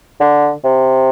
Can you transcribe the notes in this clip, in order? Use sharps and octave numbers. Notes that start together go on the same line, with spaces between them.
D3
C3